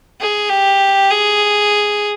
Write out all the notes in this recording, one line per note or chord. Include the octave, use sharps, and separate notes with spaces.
G#4
G4
G#4